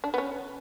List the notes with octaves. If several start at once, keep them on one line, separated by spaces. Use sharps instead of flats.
D4
B3
C#4